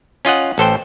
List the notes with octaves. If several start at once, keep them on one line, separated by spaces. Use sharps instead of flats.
C#4 F4 D#5 F#5
A1 A4 C5 G5